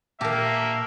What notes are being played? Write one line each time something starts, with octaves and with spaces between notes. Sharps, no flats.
A#2 A#3 G4 A#4 E5 A5